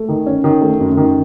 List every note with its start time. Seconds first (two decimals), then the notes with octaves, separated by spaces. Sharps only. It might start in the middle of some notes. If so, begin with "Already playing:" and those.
Already playing: A3
0.09 D#3
0.26 C#4
0.44 D#3
0.61 A3
0.80 F#2
0.97 D#3